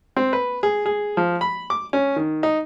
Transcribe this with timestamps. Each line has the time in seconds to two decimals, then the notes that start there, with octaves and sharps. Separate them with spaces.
0.17 C4
0.33 B4
0.63 G#4
0.86 G#4
1.17 F3
1.41 B5
1.70 D6
1.93 C#4
2.16 D#3
2.43 D#4